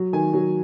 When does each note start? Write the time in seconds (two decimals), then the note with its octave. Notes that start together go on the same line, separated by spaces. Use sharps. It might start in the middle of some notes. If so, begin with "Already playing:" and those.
Already playing: F#3
0.13 D#3 G#5
0.33 F#3